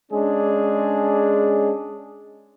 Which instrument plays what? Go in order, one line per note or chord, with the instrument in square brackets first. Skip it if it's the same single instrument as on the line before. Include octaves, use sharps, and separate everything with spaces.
[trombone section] G#3 C#4 D4 G#4